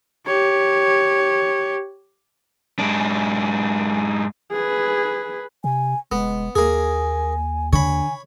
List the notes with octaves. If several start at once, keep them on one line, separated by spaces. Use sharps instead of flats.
G4 C#5
G#2 D4
G#4 B4
C3 G#5
F1 G#3 B3
D#2 A#3 G#4 G#5
D3 C#5 G#5 B5